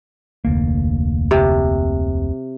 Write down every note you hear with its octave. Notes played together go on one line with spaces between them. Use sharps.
F1 D2 A#3
C3